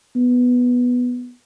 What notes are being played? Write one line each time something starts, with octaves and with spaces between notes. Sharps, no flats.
B3